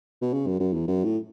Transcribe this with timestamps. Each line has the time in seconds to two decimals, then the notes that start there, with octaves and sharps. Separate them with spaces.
0.22 B2
0.33 C#3
0.47 F#2
0.60 F#2
0.74 E2
0.88 F#2
1.05 A2